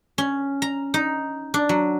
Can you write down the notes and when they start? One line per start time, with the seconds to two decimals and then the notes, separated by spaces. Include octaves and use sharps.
0.18 C#4
0.62 A#5
0.94 D#4
1.54 D4
1.69 F#3